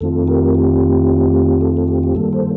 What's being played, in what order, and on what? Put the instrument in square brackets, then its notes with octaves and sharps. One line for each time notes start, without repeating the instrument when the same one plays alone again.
[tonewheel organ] F2 D#3 A3 C4 F4 A4
G4 A#4
G4
A4
A4
G4
G4
G2 D#3 G3 A#3 A4
A4 C5